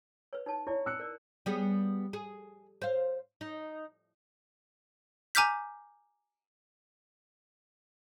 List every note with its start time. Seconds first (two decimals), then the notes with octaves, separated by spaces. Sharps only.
0.33 B4 C#5
0.46 D#4 C#5 A5
0.67 E4 C#5 D5
0.86 E6 F#6 C#7
1.00 A#4 D5
1.46 G3 B3 G#4
2.13 G#4
2.82 C5 F5
3.41 D#4
5.35 G#5 A#5 D6 F6 G6 B6